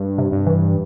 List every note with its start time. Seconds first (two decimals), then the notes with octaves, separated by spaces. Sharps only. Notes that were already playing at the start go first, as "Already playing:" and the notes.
Already playing: G2
0.18 C3
0.32 G2
0.47 E3